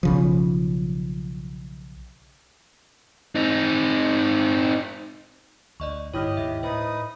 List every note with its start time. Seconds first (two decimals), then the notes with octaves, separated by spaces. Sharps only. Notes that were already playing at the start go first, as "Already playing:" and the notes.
0.03 B1 C#3 F3
3.35 C4 D#4
5.80 D2 D5 D#5 C#6
6.14 G1 G#2 E4 G4 C#5 D#5 D#6 F6
6.37 D#2 G#2 E5
6.63 A2 D#4 B4 C5 D#6